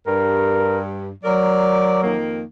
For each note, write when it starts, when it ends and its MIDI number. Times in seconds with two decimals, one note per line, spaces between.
0.07 1.08 43
0.07 0.79 70
1.23 2.16 54
1.23 1.99 70
1.23 1.99 74
2.02 2.42 41
2.02 2.42 51
2.02 2.42 58